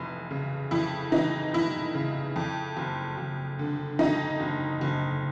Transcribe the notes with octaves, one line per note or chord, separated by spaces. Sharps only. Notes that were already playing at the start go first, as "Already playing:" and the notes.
Already playing: F1 F2 E3
C#3
F2 E4
E3 D#4
F1 E4
C#3
F2
F#1
F#1
D3
F2 D#4
F#1
F#1